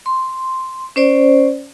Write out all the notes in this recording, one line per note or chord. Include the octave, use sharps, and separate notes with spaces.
C6
C#4 C5 D5